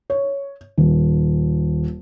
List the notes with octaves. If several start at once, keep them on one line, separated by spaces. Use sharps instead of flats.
C#5
D#1